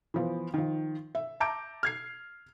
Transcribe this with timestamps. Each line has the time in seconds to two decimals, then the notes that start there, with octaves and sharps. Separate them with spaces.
0.14 E3 F3 B3
0.54 D#3 F3
1.15 E5
1.40 E5 A5 A#5 D6 G6 D7
1.83 F6 G#6 C7